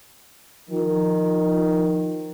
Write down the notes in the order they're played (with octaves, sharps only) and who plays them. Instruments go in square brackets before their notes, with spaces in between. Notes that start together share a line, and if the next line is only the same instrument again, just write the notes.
[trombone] D#3 [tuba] F3